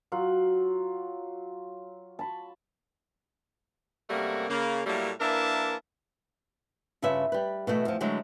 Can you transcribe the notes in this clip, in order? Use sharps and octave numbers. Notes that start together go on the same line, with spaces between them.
F#3 F4 F#5
A5 B5 C#6
F#2 C3 G3 A3 A#3 F#4
C#3 A#3
A2 F#3 G3 A3 A#3
E3 A#3 D4 A#4 E5 A5
G2 C#3 F4 B4 E5
G3 B4
B2 E3 A3
E2 F3
D3 F#3 G#3 A3